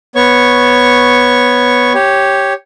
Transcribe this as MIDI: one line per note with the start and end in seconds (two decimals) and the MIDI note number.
0.15 1.93 59
0.15 1.93 73
0.15 1.93 85
1.94 2.53 67
1.94 2.53 73